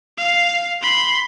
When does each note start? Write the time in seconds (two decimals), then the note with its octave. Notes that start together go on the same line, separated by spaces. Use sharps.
0.17 F5
0.82 B5 C6